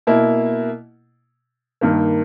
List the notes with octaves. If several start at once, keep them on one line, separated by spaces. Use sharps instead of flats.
B2 A#3 E4
G2 D#3 A#3